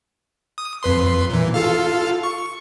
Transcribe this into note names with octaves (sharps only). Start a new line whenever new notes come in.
D#6
F2 B4 C6
A#2 E3
F4 A4 F5
C#6